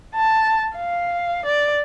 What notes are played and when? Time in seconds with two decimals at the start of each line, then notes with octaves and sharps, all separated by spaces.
0.15 A5
0.76 F5
1.46 D5